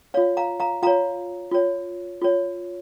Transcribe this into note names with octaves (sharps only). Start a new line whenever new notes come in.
C#5 F5
F4
F5 A#5
F5 A#5
F4 C#5 F5 A#5
F4 C#5
F4 C#5